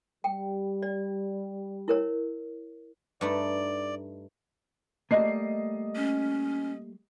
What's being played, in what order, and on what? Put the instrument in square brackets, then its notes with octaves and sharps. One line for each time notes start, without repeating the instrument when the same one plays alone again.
[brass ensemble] G3 [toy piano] G5
[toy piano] D5
E4 A#4 C#5
[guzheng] G2 A3 D#4 [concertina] D5
[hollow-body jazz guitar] G3 A3 A#3 [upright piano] D#5 C7
[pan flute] C#4